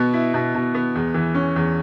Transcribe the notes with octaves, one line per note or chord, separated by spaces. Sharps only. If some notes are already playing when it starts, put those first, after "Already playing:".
Already playing: B2 B3
E4
B2
B2
B3
E2
E3
C#4
E2